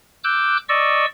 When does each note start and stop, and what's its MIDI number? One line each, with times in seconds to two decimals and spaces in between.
0.24 0.57 86
0.24 0.57 88
0.24 0.57 90
0.24 0.57 91
0.69 1.05 74
0.69 1.05 75
0.69 1.05 85
0.69 1.05 88